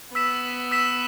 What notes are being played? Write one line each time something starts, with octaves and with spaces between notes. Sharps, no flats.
B3 E6 B6 E7
E6 B6 E7